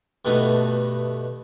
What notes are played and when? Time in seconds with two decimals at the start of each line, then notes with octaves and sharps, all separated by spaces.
0.25 G2 B2 A3 D#4